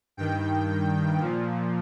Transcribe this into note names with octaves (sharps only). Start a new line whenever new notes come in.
G2 D#3 G5
A#2 F3